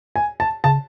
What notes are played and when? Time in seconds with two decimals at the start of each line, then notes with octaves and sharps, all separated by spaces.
0.16 G#5
0.40 A5
0.64 C#3 A5